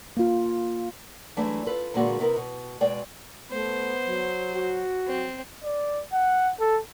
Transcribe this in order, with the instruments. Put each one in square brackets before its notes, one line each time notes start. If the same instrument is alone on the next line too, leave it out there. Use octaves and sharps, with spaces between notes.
[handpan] A#3 F4
[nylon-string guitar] E3 F#3 G#3 A3 D4
F4 A4 B4
E2 A#2 D3 G#3 A#3 F#4
C3 B3 E4 A#4
B2
B2 G#3 D5 G5
[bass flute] A3 [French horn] B3 [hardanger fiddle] C5
[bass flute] F#3
[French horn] F#4
[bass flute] F#3 [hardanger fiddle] C4
[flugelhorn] D5
F#5
A4